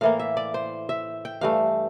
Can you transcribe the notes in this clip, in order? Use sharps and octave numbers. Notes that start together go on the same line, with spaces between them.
A2 E3 A#3 F5
E5
D5
C5
E5
G5
G2 E3 A3 F5